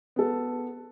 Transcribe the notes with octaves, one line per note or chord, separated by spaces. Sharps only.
B3 A4